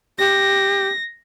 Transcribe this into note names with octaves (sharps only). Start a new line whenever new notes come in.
G4 A#6